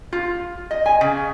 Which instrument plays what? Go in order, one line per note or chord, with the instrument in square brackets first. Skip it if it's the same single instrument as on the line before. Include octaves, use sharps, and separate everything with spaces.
[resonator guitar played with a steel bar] F4
D#5
G#5
C#3